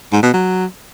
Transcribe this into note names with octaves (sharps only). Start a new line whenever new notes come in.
G#2
B2
F#3